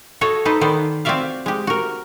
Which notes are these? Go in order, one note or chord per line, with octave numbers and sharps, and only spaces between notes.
F#4 A4 C#5 D#5
D#4 A4 B4 C5 D#5
D#3 B3 C5 D5
C4 F4 F#4 D5 E5 F5
G#3 G4
F#4 A#4